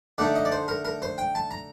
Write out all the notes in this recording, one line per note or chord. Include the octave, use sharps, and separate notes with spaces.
D3 A3 D#4 D5
D#5
D5
C5
A#4
A#4
C5
G5
A5
A#5